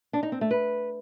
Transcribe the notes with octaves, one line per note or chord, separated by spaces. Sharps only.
D4
D#4
C4
A3
B4